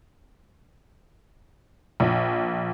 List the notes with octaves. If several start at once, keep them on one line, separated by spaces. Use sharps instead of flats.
A#1